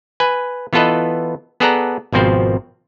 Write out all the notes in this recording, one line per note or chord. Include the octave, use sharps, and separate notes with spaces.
B4 G#5
E3 B3 F4 A4 B4 D#5
B3 G#4 A4 D5 F#5 A#5
G#1 B2 F3 C4 C5